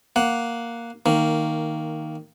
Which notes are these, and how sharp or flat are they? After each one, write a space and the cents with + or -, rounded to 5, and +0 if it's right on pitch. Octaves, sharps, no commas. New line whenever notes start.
A#3 +0 F#5 +0
D#3 +0 A#3 -10